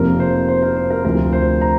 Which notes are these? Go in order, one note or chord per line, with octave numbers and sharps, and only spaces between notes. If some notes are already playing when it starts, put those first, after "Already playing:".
Already playing: F1 F2 C3 F3 A#3 A#4
C5
C5
A#4
C5
A#4
D2 C3 F3 A#4
C5
A#5